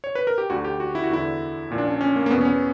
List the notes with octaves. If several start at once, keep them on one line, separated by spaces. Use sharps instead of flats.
C#5
B4
A#4
G4
D2 D3 F#4
G4
F#4
E4
F#4
E2 D3 E4
A#1 A#2
D4
C#4
C#4
A#3
A#3
E2 B2 B3
C#4
B3